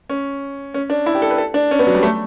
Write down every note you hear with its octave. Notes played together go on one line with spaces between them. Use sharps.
C#4
C#4
D4
E4
G4
A4
B4
A4
D4
C#4
B3
F#3
G3
A3